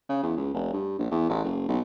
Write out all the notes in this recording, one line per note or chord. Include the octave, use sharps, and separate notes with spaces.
C#3
E2
C#2
F1
G2
A#1
E2
A1
F#1
B1